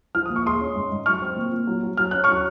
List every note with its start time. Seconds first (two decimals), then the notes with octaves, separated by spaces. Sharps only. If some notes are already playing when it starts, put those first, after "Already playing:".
0.15 F3 F6
0.26 A#2 D#6
0.36 C#6
0.46 G#3 C6 D#6
0.61 C#4
0.75 G#2
0.92 G#2
1.06 F#3 C#6 F6
1.22 C4
1.36 A#2
1.52 A#2
1.67 F#3
1.83 F#3
1.97 F#3 F6
2.11 C#4 F#6
2.24 F#3 C#6 F6